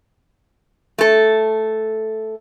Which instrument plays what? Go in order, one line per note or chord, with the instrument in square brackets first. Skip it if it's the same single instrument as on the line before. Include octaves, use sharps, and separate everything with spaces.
[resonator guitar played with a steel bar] A3 A4